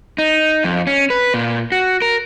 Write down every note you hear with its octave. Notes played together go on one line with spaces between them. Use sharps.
D#4
F2
C#4
B4
A#2
F#4
A#4